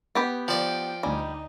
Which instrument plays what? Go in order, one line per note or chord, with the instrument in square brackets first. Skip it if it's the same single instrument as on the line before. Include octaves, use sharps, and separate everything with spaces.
[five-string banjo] B3 G4 B4
[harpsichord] F3 D5 [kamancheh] G5
[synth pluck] D2 G#5 [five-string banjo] G3 [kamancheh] D#4